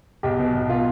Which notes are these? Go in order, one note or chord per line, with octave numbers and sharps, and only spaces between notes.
B1 G4
B2
B1
B2 F4